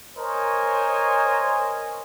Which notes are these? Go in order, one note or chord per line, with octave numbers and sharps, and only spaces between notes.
A#4 C5 C#5 D#5 G#5